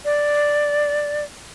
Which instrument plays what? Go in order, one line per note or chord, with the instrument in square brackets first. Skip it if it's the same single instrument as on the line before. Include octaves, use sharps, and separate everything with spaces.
[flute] D5